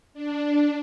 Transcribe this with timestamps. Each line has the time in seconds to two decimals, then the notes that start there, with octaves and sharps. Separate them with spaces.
0.14 D4